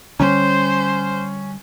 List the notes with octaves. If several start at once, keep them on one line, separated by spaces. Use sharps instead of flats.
D3 G3 C#4 C5